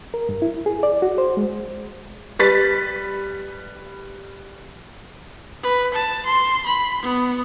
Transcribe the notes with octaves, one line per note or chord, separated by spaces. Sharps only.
A#4
G2
E4
G#4
D5
F#4
C5
G#3
G3 B4 A6 B6
B4
A5
C6
B5
B3